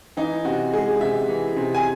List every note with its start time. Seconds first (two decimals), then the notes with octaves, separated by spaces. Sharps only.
0.17 E3 D#4
0.45 C3 F#4
0.73 G#3 G#4
1.01 C3 E5
1.28 E3
1.56 C3
1.75 G#5